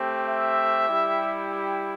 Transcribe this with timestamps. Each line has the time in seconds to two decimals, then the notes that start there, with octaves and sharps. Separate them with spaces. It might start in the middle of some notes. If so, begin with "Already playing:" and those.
Already playing: A3 C4 G4
0.27 E5
0.89 G3 E4 G4
1.51 G5